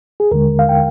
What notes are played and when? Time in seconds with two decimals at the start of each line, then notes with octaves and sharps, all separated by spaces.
0.20 G#4
0.31 D#2 D3 G#3 A#4
0.59 F5
0.69 G5